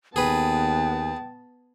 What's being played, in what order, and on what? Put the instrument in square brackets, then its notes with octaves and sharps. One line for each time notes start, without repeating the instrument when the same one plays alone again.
[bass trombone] D#2 [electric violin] B3 A5 [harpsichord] G#4 B4 [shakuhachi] G5